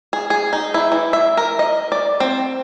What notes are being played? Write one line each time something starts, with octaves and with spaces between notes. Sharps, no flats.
G#4
G#4
D#4
E4
E3
E5
A#4
D#5
D5
C4